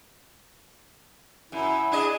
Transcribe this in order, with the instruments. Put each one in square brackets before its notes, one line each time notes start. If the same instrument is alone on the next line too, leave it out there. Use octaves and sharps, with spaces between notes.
[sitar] F#2 [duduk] E4
[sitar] D4 G#4 D#5